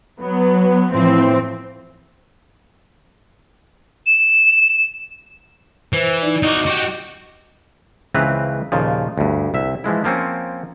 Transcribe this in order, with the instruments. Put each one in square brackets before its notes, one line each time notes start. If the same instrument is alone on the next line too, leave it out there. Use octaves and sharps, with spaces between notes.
[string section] F#3 B3
A2 E3 F3 C4
[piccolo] E7
[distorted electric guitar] E3 [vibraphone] C5
[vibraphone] D#4 E4 D5
[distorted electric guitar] D#4 F#4 [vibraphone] D#5 D6
[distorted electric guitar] F#4 G4 [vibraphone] D#5
[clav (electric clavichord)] C#2 C#3 E3 C4 B4 A#5
D#2 A#2 C#3 F3
D2 G2
C2 E5
E3 F3 G#3 E4
F3 A#3 C4 C#4